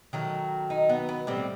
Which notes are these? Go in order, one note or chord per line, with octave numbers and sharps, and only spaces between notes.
D#3 F#3 A3
D#4
B3
B3
A2 G3 C4